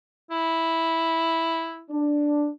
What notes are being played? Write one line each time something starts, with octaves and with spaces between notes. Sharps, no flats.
E4
D4